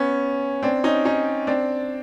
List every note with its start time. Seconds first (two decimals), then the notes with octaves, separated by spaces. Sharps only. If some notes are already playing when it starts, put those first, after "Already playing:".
Already playing: B3 C#4
0.63 C4 D4
0.84 C#4 D#4
1.05 C#4 D#4
1.47 C4 D4